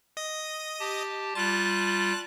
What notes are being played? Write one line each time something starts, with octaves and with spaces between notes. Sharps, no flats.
D#5 D#6
G4 A5
G3 F4 A5 F#6